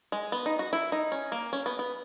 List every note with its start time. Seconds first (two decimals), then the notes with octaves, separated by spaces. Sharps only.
0.12 G#3
0.32 B3
0.46 D#4
0.59 F#4
0.73 E4
0.92 D#4
1.12 C#4
1.32 A#3
1.53 C#4
1.66 B3
1.79 B3